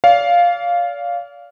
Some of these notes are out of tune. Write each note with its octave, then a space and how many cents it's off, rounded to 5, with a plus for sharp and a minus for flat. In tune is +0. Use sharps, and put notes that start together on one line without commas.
D5 -40 F5 +0